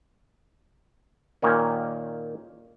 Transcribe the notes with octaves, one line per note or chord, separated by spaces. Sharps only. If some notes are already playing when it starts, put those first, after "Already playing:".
A#2 D#3 A#3 C#4